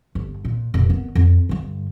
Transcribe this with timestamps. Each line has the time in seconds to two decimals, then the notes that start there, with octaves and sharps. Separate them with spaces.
0.15 G1
0.45 A#2
0.74 F1 A#2
0.89 D#3 B3
1.15 F2
1.49 G2 D3